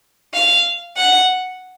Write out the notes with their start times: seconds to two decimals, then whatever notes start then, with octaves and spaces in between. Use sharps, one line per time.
0.34 F5
0.97 F#5